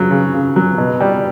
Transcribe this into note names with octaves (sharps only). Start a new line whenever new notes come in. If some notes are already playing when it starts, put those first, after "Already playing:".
Already playing: C#3 F#3
C#3
C#3
F#3
B2
G3